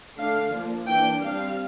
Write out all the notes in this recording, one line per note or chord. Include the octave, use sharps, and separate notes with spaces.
D3 A3 D4 F5
F3 A#3 D4
E3 A#3 D4 G5
G3 C4 F5